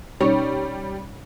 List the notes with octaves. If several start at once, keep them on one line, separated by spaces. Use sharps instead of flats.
B2 G3 C#4 D#4 C#5